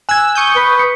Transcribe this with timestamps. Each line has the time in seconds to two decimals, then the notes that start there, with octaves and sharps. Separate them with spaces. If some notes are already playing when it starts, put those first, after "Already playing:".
0.09 G#5 E6 F#6 G#6
0.35 C#6 D#6 G6
0.56 B4
0.79 C#7